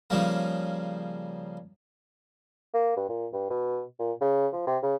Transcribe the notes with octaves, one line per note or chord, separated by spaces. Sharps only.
C#3 F3 G3 A#3
A#3
G2
A#2
G2
B2
A#2
C#3
F3
C3
C#3